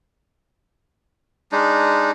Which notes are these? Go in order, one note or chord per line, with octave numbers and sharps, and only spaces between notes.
G#3 D4 D#4